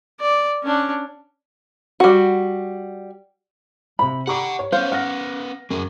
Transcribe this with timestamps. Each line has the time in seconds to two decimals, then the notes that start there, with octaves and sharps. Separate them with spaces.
0.20 D5
0.63 C#4 D4
2.00 G3 F#4
3.99 C3 C5 B5
4.27 G4 D5 F#5 A#5 C#6
4.59 C#5
4.72 B3 C#4 C5 F5
4.92 F#5 F6 A#6
5.70 F#2 F#3 G#4